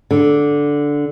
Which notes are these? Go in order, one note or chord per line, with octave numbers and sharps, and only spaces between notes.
D3